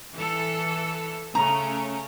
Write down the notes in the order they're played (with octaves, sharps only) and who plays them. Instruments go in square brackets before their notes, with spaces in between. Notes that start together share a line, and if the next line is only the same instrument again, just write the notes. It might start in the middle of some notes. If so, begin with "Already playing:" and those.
[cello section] E3 A4
[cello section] C#3 A3 C#4 [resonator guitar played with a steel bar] A#5